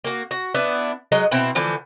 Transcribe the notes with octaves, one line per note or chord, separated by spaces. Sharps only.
A#3 F#4
F#4
B3 D4 E4
F#3 G#3 D#5
B2 C4 E4
D3 E3 F3 A3